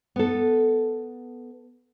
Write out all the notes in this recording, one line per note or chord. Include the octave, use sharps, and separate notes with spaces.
B3 A4